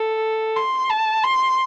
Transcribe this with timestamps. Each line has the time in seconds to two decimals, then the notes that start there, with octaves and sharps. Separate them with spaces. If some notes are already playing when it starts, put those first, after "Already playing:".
Already playing: A4
0.56 C6
0.90 A5
1.24 C6